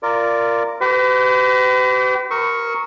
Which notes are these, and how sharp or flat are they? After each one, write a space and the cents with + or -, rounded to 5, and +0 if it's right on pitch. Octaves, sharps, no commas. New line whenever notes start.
F4 -15 A#4 -10 D5 +0
G4 -40 B4 +40
A#4 +0 C#6 +0 E6 -40